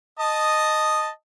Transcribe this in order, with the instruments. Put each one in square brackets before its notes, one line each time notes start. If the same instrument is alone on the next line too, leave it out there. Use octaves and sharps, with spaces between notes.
[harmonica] D#5 A5 D#6